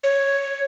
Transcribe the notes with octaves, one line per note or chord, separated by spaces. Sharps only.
C#5